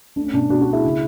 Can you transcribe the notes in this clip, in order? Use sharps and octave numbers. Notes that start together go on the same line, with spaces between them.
A3 D4
C#4
B2 D4
B2 D4 F#4
D4 F#4
A3
E4 G#4
C#3